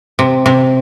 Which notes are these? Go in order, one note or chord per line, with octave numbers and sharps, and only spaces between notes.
C3
C3